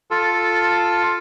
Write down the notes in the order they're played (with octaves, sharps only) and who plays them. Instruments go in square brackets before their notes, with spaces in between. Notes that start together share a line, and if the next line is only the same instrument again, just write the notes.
[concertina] F4 A4